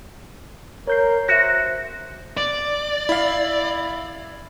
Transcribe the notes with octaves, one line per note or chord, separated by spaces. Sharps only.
A#4 C#5 G6 C7
F#4 C5 E5 F#6 A#6
D5
E4 F5